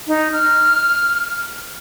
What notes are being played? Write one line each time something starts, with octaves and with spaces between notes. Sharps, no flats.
D#4
F6